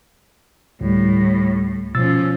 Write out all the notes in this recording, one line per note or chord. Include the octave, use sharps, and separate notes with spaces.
D2 A2 G3
B2 F3 C#4 E6 A6